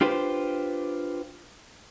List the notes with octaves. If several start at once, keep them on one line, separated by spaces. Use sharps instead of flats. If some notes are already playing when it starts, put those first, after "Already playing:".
D4 F4 G4 B4 C5